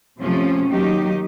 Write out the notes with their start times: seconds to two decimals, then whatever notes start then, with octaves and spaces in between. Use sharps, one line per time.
0.18 C3 F3 A3 C#4
0.68 D#3 F#3 A#3 D#4 G4